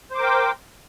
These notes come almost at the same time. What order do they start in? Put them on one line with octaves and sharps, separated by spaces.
C5 D6 A#4 G5